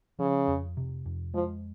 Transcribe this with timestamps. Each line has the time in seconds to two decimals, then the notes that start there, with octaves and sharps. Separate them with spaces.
0.19 C#3 F3
0.48 F2
0.77 C3
1.06 F2
1.34 F3 G#3